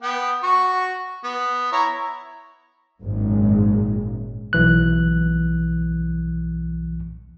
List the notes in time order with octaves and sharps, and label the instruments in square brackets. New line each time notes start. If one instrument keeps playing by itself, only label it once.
[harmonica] B3 G5
F#4 C#6
B3
E4 C#5 A#5
[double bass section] G#1 F#2 A#2 G#3
[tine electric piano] B1 E3 F#6